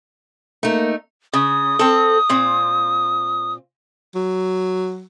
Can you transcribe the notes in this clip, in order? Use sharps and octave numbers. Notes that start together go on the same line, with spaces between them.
A3 A#3 D#4
C#3 D#6
C4 A4
A#2 C4
F#3